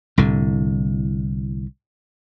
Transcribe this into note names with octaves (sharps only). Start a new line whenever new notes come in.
C2 A2 D3